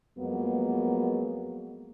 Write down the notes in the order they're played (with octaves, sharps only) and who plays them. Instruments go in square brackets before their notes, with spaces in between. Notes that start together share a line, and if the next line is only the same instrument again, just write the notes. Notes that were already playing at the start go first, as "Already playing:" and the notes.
[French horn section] F2 F#3 G#3 A#3 B3